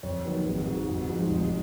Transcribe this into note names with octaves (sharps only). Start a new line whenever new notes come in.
F2 C#5
D#3 F#3 A#3 D#4 B4
G#1 G#4
G#2 F3 G#3 F#4
F2
F3 G#3 D#4
F1